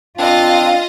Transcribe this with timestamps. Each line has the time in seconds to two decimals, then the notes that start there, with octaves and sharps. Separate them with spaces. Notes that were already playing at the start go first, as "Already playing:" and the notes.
0.18 C4 D4 F4 D#5 F5